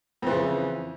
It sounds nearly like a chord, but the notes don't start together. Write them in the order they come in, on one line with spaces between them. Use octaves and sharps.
F2 E3 C#3